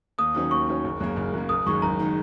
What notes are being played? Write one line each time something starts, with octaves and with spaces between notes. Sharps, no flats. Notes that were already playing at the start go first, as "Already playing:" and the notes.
D#2 D#6
D#3 F#3 C#4
D#2 C#6
D#3 F#3 C#4
F#1
F#2 C#3 A#3
F#1
F#2 C#3 A#3
F#1 D#6
F#2 D#3 G#3 D#4 C#6
F#1 A#5
D#3 G#3 D#4